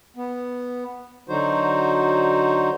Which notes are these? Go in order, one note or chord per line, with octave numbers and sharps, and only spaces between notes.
B3
D3 F#3 D#4 F#4 C5